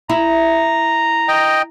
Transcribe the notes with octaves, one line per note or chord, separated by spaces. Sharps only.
E4 A#5
D#5 G5